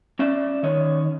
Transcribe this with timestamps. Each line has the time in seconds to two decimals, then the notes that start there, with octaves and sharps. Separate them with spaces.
0.19 C#4 D5 E5
0.63 D#3 C#5 D#5